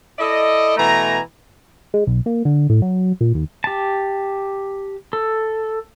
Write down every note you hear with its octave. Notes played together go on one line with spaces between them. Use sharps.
E4 A4 D5 D#5
B2 E3 A3 G#5 A#5
G#3
B1
A#3
D3
A2
F#3
A#2
D#2
G4 A5
A4